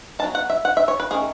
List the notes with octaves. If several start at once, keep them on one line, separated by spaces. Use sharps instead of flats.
F#3 B3 D#4 A5
F#5
E5
F#5
E5
C#5
B4
D#3 A3 C#4 G#4